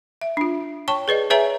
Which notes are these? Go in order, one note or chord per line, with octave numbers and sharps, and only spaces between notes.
E5
D4 F4
C#5 G5 A5 C#6
G#4 B4 D5 D#5
G#4 B4 C#5 E5 G#5 A#5